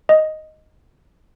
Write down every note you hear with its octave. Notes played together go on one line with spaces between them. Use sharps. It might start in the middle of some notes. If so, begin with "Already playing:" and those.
D#5